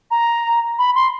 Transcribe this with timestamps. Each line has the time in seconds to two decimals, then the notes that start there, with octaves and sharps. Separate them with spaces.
0.11 A#5
0.79 B5
0.95 C6